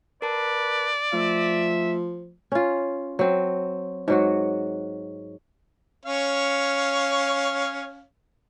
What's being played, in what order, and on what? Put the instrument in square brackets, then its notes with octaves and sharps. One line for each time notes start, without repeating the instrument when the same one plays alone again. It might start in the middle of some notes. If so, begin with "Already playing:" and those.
[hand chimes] A#4 A5 [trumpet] B4 [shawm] D5
[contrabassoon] F3 [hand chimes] A3 [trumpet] E5
[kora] C#4 F4
F#3 C4
G#2 F#3 F#4
[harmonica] C#4 C#5 F5